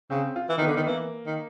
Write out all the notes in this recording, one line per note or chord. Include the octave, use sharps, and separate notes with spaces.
C#3 C4
F4
E3
D#3 B3
D3
D#3 B3
E3 A#3
D#3